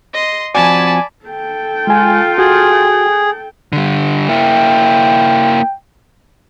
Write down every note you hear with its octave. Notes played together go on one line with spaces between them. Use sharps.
D#5 C6
F3 C4 F#4 D5 G#5 A5 B5
A4 G5
G#3 F4 G#5
F#4 G#4
D3 G3
A#3 E4 G5